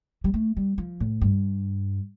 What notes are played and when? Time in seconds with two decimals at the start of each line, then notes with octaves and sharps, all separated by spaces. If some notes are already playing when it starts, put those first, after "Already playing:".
0.24 G3
0.34 A3
0.57 G3
0.78 F3
1.00 A2
1.21 G2